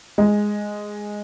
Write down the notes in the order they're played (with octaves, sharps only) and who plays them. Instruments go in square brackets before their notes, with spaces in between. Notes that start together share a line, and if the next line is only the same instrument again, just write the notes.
[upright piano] G#3